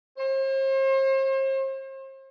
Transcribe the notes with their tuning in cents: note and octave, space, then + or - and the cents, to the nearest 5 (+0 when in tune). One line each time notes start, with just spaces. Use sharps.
C5 +40